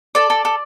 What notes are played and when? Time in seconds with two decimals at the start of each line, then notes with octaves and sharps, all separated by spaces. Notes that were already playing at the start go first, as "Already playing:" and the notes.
0.15 A4 D5
0.30 A4
0.45 A4